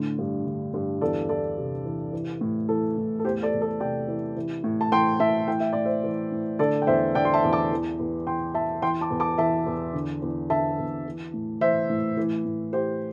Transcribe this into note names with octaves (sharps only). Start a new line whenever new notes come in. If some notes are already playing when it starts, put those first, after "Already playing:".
Already playing: A2 D3
G2
D3
G2
E2 A4 D5
E2 A4 D5
C3
E3
E3
A2
E3 A4
A2
A4
E2 G4 C5
A4 D5
E2
A4 D5
C3 D5 G5
E3
E3
A2
A5
E3 G5 C6
A2 E5 A5
E3 G5
E5
A2 D5
C5 E5
E3
A2
D3 A4 D5
G5
E2 C5 E5
D3 D5 G5
C6
E5 A5
E2
A5 D6
E3
E2
E3 G5 C6
E2 E5 A5
E3 G5 C6
A5 D6
E2
A5 D6
E3 E5 A5
E2
D3
E2
D3 E5 A5
E2
E3
A2
E3 C5 E5
A2
E3
A2
E3 G4 C5